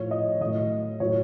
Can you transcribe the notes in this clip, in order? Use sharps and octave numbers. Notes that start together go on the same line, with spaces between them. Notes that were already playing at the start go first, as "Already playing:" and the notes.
Already playing: A2 F3 C#5
D#5
A2 F#3 D#5
A2 F#3 C#5